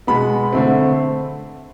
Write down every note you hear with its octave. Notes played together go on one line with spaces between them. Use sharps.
B2 G#3 B3 B5
D3 A3 C4